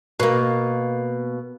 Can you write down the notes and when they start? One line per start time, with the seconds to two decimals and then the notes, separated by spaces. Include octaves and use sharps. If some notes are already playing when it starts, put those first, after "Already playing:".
0.20 B2 A#3